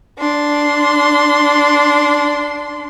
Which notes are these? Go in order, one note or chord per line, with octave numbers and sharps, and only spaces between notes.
D4 C6